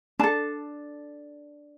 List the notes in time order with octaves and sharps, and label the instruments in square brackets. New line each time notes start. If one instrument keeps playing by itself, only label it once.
[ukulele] D4 A4 A5